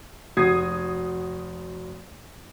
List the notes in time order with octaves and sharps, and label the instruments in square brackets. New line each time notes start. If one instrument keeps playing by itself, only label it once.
[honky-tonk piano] F1 F#4 D#6 G#6 C7